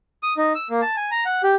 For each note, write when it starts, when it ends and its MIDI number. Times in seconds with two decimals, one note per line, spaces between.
0.23 0.33 87
0.37 0.53 63
0.55 0.68 88
0.70 0.81 58
0.82 0.96 81
0.97 1.10 80
1.11 1.24 82
1.26 1.42 78
1.43 1.56 67